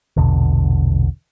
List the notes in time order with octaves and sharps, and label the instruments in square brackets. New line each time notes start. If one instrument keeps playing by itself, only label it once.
[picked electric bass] A#1 E2 B2 D3